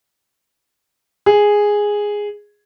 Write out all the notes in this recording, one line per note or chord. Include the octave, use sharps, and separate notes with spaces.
G#4